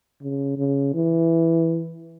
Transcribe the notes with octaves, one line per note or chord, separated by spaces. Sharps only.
C#3
C#3
E3